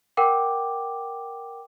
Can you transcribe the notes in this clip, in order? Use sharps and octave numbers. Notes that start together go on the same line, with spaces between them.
A#4 F#5 G5 D6